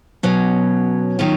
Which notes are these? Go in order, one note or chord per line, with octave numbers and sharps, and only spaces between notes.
B2 F#3 C#4
D#3 F#3 C#4 F4